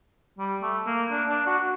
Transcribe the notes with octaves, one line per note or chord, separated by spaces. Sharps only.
G3
A3
A#3
D4
D4
F#4